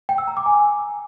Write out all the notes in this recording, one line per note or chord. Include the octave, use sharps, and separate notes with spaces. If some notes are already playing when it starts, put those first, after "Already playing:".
G5
E6
A#5
D6
G#5